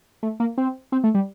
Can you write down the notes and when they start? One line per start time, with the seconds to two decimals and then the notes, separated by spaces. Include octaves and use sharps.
0.23 A3
0.40 A#3
0.58 C4
0.92 C4
1.04 A3
1.15 G3